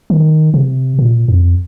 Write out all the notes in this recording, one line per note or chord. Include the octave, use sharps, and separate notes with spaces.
D#3
C3
A#2
F2